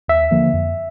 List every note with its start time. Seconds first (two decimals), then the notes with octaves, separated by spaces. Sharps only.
0.08 D#2 E5
0.31 D3 F3 A#3
0.54 F2